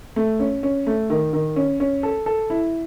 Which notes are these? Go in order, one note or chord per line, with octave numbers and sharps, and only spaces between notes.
A3
C#4
C#4
A3
D#3
D#3
C#4
C#4
A4
A4
E4